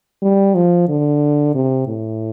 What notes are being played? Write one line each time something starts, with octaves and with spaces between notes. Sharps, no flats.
G3
F3
D3
C3
A2